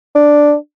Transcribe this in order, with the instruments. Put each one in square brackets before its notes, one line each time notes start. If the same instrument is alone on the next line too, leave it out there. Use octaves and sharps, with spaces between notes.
[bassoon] D4